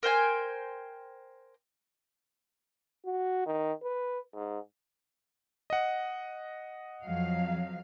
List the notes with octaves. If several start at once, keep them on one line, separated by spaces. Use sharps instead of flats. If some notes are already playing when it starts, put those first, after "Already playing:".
A#4 C5 G5 G#5
F#4
D#3
B4
G#2
D#5 F#5
F2 F#3 F5